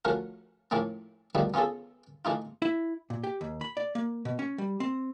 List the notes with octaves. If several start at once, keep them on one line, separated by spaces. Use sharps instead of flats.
F3 A3 C#4 F#4 A#4
A2 F3 A3 A#3 C#4
B2 D#3 F3 G3 A3 B3
B3 C#4 F4 G#4 A4
E3 A3 D#4 F4
E4
A#2
G4
D#2
B5
D5
A#3
B2
C#4
G3
C4